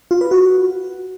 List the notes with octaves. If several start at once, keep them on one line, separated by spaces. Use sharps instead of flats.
F4
B4
F#4